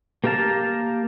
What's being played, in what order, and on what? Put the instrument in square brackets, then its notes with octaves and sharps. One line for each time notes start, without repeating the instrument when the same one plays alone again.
[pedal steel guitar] A#3 G4 A#4 F5 A5